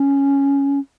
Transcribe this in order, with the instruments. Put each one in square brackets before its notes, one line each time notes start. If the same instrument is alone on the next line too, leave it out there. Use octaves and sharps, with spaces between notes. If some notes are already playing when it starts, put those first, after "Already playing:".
Already playing: [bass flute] C#4